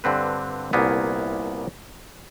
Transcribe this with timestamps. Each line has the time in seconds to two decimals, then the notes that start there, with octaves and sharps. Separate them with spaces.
0.04 G2 D3 C4 B4
0.73 C2 A#2 A#3 B3 E4